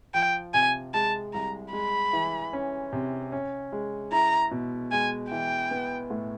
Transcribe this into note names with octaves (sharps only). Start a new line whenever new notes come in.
F3 G5
C3 G#5
G#3 A5
C2 A#5
G#3 B5
E3
C#4
C3
C#4
G#3
E4 A#5
B2
G#3 G#5
E3 G5
B3
A2